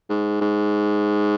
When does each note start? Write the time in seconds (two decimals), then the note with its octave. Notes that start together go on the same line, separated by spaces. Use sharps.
0.09 G#2
0.41 G#2